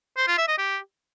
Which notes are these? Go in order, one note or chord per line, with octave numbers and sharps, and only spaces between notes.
C5
F4
E5
D#5
G4